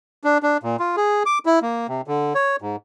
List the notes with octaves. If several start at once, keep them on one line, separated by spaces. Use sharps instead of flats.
D4
D4
A#2
F4
G#4
D6
E4
A#3
C3
D3
C#5
G#2